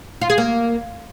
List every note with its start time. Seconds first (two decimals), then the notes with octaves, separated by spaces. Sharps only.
0.21 F4
0.30 G#4
0.38 A#3